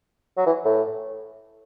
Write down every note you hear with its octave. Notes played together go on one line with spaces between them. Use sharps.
F#3
E3
A2